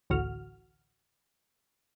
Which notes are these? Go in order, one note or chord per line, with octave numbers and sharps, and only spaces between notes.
A1 D2 F#4 F6